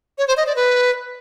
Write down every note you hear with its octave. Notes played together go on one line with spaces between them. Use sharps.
C#5
C5
D#5
D5
B4